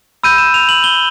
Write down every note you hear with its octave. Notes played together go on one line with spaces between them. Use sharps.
B5 E6 G6 D#7
E7
F7
F#7
G7